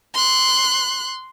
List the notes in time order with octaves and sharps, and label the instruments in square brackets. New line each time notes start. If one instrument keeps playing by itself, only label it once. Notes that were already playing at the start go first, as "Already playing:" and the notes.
[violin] C6 F#6